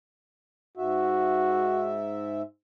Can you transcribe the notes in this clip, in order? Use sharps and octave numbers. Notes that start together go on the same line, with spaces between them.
G#2 F#4 E5